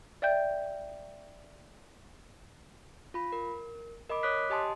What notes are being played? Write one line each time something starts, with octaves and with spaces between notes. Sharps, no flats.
D5 E5 G5 G6
F4 B5
A#4
A#4 D#5 B5 D6
C#5 D6 D#6 F#6 B6
G4 D#5 G#5 A5 C6 D#6